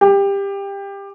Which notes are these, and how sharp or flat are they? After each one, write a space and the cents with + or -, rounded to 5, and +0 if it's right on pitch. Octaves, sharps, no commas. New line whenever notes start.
G4 +20